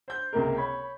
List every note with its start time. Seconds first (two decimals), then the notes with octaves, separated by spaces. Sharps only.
0.08 C5 G6
0.33 C#2 C3 A#3 A#4
0.57 C#5 B5